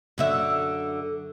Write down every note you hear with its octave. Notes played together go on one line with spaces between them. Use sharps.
F#2 D3 E5